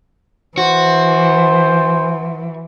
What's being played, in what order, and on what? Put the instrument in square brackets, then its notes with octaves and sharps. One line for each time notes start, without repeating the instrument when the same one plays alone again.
[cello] E3 [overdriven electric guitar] F#4 [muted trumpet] C5